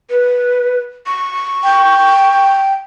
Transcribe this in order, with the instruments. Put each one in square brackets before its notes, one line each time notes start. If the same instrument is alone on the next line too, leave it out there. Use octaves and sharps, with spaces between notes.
[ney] B4
C#6
[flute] G5